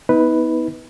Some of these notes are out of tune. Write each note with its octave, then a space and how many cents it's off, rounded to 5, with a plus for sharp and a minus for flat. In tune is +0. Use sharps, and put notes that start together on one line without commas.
B3 +0 D#4 +40 B4 +0